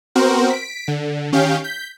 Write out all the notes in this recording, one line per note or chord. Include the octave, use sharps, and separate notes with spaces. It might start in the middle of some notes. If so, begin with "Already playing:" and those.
B3 C4 F#4 A#4 C5
B6 D7
D3
D#3 C#4 G4 F5 G6
G6 B6